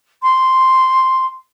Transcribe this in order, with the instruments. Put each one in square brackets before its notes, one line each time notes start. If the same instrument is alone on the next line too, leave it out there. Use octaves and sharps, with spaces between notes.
[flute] C6